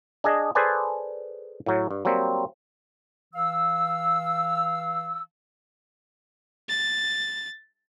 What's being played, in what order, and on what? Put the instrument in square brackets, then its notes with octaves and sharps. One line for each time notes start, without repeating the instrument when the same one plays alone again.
[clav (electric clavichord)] D4 G#4 D#5
G#4 A4 B4 C5 D5 G#5
A2 F#3
G2
F#3 G3 A#3 C4
[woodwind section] E3 F5 E6
[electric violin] A6